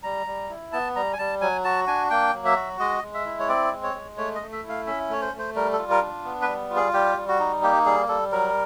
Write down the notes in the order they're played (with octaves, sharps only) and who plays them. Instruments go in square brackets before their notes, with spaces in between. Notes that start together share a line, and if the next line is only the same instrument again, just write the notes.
[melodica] G3 A#5
G3
E4
B3 A5
G3 A#5
G#5
G3 A5
F#3 G#5
F#4 A5
D4 G#5
A#3 G5
F#3
E5
F#4
G#3 D#5
G#3
E5
E4
C#5
C4 D5
G#3
C#5
G#3
A3 C#5
D#5
A3
E5
E4
F5
C#4 E5
A3 C#5
C5
A3
C5
G3 A#4
A4
F4
A#4
D4
B3
B4
G3
F4
G#4
G3 G4
G3
F#4
D#4
A#3 G4
G3 G#4
G3 A4
F#3 A#4